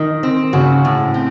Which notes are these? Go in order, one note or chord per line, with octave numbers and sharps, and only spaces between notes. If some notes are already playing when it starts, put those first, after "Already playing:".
Already playing: D#3
C4
C#3 F#4
A2
C4